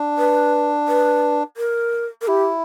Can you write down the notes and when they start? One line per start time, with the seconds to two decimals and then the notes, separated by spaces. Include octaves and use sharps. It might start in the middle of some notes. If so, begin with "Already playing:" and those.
Already playing: D4
0.18 B4
0.88 B4
1.57 A#4
2.21 A#4
2.27 E4 G4